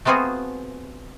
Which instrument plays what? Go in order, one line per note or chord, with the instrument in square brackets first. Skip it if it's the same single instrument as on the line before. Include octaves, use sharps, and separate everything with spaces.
[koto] A3 B3 C4 F4 F#4 G#4